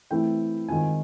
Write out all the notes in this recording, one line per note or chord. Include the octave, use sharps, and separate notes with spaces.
E3 A3 C4 E4 G5
D#3 G#3 C4 F4 G#5